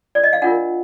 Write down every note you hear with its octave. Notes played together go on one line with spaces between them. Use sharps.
D5
D#5
F5
D4 F4 A#4 F#5